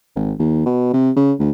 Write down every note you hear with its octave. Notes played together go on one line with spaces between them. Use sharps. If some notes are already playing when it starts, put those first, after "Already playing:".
G#1
D#2
B2
C3
C#3
D2